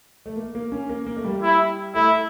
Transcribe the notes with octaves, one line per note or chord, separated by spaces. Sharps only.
A3
A#3
A#3
C#4
A#3
A#3
A3
G3
E4
A3 E4